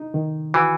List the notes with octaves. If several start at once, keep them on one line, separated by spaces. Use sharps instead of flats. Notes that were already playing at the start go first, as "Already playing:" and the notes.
Already playing: D#4
D#3
E3 F#4